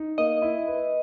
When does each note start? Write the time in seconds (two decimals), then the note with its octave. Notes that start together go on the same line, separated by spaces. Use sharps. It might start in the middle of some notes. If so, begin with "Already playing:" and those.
Already playing: D#4
0.18 A#3 D#5
0.42 E4
0.67 B4